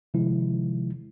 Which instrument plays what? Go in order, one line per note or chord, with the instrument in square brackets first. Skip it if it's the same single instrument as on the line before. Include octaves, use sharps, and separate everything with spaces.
[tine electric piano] C3 D#3 F3 G#3 E4